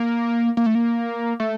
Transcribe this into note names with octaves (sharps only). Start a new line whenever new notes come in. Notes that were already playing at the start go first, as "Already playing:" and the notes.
Already playing: A#3
A#3
A3
A#3
A3